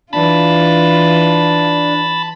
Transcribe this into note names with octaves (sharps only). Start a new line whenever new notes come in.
E3 D4 F4 A5 B5